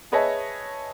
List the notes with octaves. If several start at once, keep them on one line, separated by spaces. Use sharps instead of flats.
G#4 B4 C#5 D#5 E5 A5